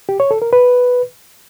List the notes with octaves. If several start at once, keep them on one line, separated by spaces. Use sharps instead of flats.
G4
C#5
A4
A#4
B4